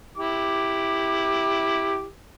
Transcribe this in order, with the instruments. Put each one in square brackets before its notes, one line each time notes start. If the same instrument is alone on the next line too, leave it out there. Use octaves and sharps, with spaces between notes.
[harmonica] E4 G4 [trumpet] D6